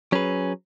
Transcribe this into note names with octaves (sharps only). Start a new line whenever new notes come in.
F#3 C#4 G#4 B4